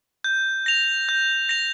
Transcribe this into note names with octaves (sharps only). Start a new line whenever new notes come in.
G6
A#6 F7
G6
A#6 F7